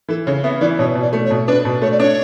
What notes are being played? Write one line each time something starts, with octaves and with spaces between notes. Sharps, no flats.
E3 A4
C#3 C#5
B3 E5
E3 D5
B2 C#5
B2
D5
A3
C#5
B2
D4 B4
B2
A3 C#5
D5
D4 C#5